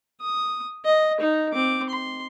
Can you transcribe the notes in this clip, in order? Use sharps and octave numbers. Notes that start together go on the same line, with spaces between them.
D#6
D#5
D#4
C4 D6
C6